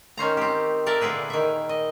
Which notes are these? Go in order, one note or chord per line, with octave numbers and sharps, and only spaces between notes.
D#3 C#4 C5 A#5
C4 G4
A4 A#4 D5 E5 A5
A#2 D3 E4 G#4 B4 G5
D#3 E5
D#5